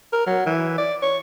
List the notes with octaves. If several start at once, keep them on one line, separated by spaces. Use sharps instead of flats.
A#4
F#3
E3
D5
C#5